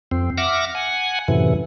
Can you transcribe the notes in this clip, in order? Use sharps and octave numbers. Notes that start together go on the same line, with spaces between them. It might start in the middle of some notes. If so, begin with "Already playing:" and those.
F2 C4
E5 F#5 D6 F6 A#6
F#5 G#5
F#2 A2 C3 E3